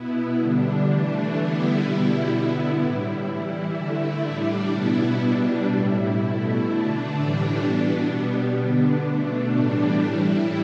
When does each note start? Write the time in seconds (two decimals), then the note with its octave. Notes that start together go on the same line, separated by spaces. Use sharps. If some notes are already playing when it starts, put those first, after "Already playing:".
Already playing: B2 B3 E4
0.38 D3 G3 D4
0.86 E3 A3 D4
1.35 D3 G3 B3 E4
1.83 B2 G3 E4
2.31 D3 B3 E4
2.79 A2 G3 E4
3.28 E3 G3 E4
3.76 D3 A3 E4
4.24 A2 G3 D4
4.73 B2 B3 E4
5.21 B2 G3 D4
5.69 A2 G3 E4
6.17 B2 A3 E4
6.65 D3 A3 D4
7.14 A2 E3 G3 D4
7.62 B2 B3 D4
8.10 B2 G3 B3
8.58 D3 B3 D4
9.06 B2 A3 D4
9.55 A2 E3 G3 D4
10.03 A2 G3 E4